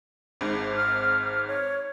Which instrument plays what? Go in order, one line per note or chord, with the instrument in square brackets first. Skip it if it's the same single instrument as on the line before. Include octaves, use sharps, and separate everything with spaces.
[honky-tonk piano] G#1 G#2
[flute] F6
C#5